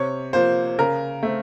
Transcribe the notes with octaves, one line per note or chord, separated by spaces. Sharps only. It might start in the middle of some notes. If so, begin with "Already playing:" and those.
Already playing: C3 C#5
F3 A#3 C5
C#3 A#4
A3 C4